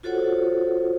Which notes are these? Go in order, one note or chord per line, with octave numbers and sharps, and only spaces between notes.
F4 F#4 A4 C5 C#5 F#5